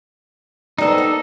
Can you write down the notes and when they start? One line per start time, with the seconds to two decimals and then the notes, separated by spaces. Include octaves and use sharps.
0.78 G3 B3 D#4 A4 C5
0.98 A#3